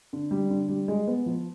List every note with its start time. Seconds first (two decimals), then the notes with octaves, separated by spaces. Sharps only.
0.13 D3
0.31 G3
0.50 D3
0.69 G3
0.88 G#3
1.07 B3
1.26 F3